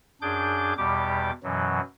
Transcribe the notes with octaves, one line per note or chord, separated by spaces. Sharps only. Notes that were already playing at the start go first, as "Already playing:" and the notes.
F#2 D4 G#4 D6 G6
E2 B2 G3 G4 D6
F#2 B2 E3 F#3